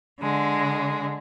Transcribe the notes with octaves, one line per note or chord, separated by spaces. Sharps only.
D3 G#3